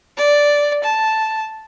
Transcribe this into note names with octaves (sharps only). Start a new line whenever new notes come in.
D5
A5